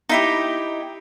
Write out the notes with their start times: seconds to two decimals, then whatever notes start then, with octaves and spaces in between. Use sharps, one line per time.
0.09 D#4 E4 G4